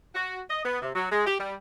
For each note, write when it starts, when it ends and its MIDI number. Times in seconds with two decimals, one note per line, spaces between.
0.15 0.40 66
0.50 0.64 75
0.64 0.80 59
0.82 0.90 48
0.95 1.05 54
1.11 1.23 56
1.27 1.36 67
1.39 1.54 55